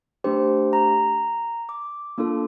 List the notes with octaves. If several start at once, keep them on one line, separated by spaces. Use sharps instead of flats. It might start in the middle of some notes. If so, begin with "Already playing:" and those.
A3 D4 G4 C5
A#5
D6
A#3 D4 F4 A4